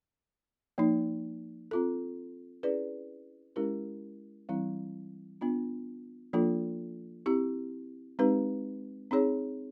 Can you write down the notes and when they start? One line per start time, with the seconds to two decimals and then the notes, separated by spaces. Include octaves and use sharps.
0.78 F3 A#3 D#4
1.71 C4 F4 A4
2.63 C#4 E4 G#4 B4 D5
3.56 G#3 C#4 E4 G4 A#4
4.49 E3 G3 C4 E4
5.41 B3 D4 F4
6.33 F3 A#3 D4 F4 A4
7.26 C4 E4 G4
8.19 G#3 C4 D#4 G4 B4
9.11 C4 D#4 G#4 C#5